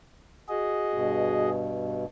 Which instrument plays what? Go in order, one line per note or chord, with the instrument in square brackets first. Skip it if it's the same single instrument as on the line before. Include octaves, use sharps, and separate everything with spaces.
[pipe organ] F#4 G#4 D#5
[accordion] G2 B2